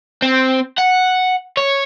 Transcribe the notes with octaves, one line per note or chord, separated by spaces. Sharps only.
C4
F#5
C#5